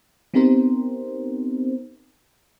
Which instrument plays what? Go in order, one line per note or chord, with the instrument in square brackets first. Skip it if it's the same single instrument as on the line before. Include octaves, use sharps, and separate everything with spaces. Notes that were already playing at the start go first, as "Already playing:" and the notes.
[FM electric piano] B3 C4 D#4 G4 A#4 C5